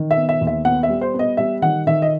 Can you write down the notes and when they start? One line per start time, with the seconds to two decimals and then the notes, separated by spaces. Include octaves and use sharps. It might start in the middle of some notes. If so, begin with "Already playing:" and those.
Already playing: D#3
0.11 E5
0.17 B3
0.29 E5
0.41 D#2
0.47 E5
0.65 B3 F#5
0.83 E5
0.89 G3
1.01 C5
1.14 B3
1.19 D#5
1.37 G3 E5
1.62 D#3 F#5
1.87 D#3 E5
2.02 D#5